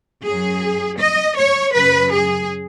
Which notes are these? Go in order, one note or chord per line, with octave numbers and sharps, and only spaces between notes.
F#2 F#3 G#4
D#5
C#5
F#2 C#3 F#3 B4
G#4